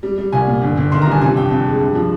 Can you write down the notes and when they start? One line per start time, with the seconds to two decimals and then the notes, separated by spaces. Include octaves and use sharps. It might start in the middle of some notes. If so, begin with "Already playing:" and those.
0.03 G3
0.18 G3
0.32 C2 G#5
0.47 A#2
0.62 G1
0.78 G1
0.92 D#3 C6
1.02 A#5
1.07 G2 G#5
1.22 C3 G#5
1.36 F2 G5
1.51 F2 G5
1.67 G#3
1.81 G2
1.95 F3